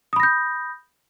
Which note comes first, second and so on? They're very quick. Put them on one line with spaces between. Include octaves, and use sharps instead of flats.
D#6 B5 A#6 G6